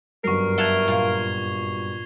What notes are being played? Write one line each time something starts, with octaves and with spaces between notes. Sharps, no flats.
G1 F#2 A#4 C#6 C7
E5 F#5 A5 G#6 F7 G7
A#2 F5